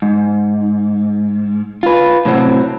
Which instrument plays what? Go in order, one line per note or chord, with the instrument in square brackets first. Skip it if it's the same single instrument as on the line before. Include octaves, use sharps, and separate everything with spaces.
[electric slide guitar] G#2
F4 B4
A2 C3 F#3 C4 F#4